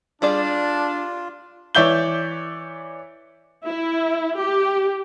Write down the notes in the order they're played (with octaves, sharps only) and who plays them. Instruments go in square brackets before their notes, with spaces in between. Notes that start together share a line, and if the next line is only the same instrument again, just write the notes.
[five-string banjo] G3 G#4 D5 [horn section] D4 [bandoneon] F4
[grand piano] E3 C#5 D5 E5 G6 G7
[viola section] E4
G4